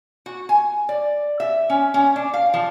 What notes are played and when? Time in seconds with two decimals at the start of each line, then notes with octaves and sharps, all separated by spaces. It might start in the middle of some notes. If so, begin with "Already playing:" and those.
0.26 F#4
0.49 G#5
0.89 D5
1.40 E5
1.70 C#4
1.94 C#4
2.16 D4
2.34 F5
2.54 F3